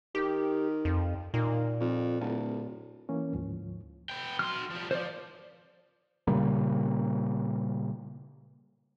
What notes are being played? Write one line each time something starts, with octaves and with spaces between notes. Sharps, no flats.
D#3 G4
F2
A#2 D#3
F2
D1
E3 A#3 C#4
D2 G#2 F3
B3 G5
F#3 C6 F6
F3 G3
F3 C5 D5
A#2 C#3 G3 A#3